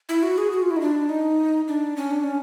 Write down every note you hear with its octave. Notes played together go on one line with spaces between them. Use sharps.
E4
F#4
G#4
F#4
F4
E4
D#4
D4
D#4
D4
C#4
D4
C#4